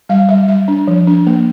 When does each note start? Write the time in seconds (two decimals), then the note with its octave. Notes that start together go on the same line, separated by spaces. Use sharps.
0.09 G3 F5
0.29 G3 E5
0.48 G3 E5
0.68 D4
0.88 F3
1.07 D4
1.27 A#3